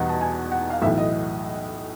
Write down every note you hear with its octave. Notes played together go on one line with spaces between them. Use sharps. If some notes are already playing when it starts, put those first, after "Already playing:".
Already playing: E2 B2 G3 B3 D#4 F#5
A5
G#5
F#5
F5
B1 A2 E3 E5
D#5